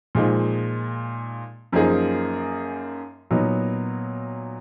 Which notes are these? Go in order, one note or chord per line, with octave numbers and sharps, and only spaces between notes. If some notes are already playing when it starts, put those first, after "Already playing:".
A#2 F3 G#3 D#4
F#2 F3 A#3 D#4 G#4
A#2 F#3 B3 D#4